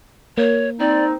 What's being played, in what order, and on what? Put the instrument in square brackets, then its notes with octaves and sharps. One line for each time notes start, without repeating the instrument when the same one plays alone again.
[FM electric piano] A#3 [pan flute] C#5
[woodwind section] C4 D#4 [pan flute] D5